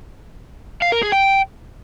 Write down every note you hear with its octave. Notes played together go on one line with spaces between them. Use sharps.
F5
A#4
G#4
G5